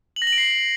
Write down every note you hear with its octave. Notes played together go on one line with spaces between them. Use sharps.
F#7
A#6
F#7
D7
C7